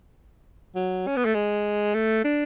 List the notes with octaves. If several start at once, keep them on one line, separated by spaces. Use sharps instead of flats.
F#3
C#4
B3
A3
G#3
A3
D4